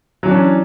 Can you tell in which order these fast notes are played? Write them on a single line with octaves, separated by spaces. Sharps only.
F#3 E3 D4 C#4